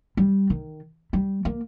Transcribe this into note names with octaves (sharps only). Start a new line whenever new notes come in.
G3
D#3
G3
A#3